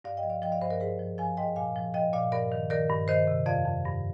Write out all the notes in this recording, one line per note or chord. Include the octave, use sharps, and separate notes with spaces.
G2 D5 F5
D#5 G5
F3
D5 F5
F3 D#5 G5
D5 F5
G2 C5 D#5
A#4 D5
G#2 G#4 C5
F3
F3 F5 G#5
G#2 D#5 G5
A#2 F5 G#5
F3
F3 D#5 G5
A#2 D5 F5
G2 A#4 D5
D#3
D#3 A#4 D5
G2
D#3 C5 D#5
C3
F2 D5 F5
F2
G2